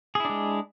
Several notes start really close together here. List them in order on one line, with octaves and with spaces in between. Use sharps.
G#4 E4 D4 G#3